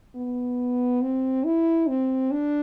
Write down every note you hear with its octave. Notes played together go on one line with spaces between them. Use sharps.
B3
C4
E4
C4
D4